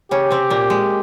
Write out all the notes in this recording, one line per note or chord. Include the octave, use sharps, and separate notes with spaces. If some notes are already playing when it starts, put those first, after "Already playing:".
C#3 C#4 G4
C3 C4
A#2 A#3
G#3